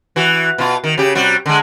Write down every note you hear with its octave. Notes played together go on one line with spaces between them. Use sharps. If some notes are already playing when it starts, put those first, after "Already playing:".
E3 F#4
B2 F4
D#3
C#3 G4
C3 G3 F#4
D3 G#3